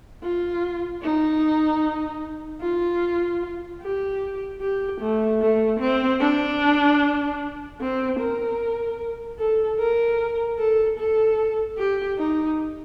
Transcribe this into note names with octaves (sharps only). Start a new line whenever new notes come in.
F4
D#4
F4
G4
G4
A3
A3
C4
D4
C4
A#4
A4
A#4
A4
A4
G4
D#4